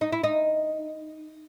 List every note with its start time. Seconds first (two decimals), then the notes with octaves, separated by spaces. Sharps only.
0.01 D#4
0.12 E4
0.24 D#4